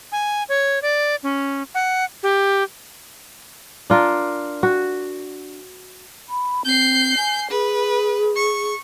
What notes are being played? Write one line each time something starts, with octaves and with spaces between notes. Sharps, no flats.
G#5
C#5
D5
C#4
F#5
G4
D4 F4 A#4
F#4
B5
C4 G6 C7
G#5
G#4 B4
C#6